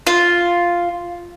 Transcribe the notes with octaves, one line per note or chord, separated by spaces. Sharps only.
F4